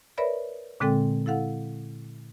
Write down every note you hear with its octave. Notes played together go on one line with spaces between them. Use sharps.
A#4 B4 C#5 D5 E5 B5
A#2 D3 G#3 C4 A4 G5
E4 A4 F5 F#5